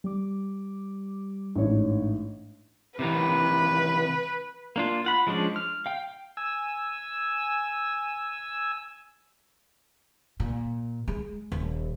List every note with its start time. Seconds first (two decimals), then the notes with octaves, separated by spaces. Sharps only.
0.04 G3 D6
1.55 A1 G#2 D4 C#5
2.99 C3 D#3 E3 B4
4.76 A#3 D4 F4
5.05 F4 F#5 B5
5.27 F3 G#3 C#4 D4 D5
5.56 F6
5.86 F5 G5
6.37 G#5 E6
10.40 A#2
11.08 G#3
11.52 D#1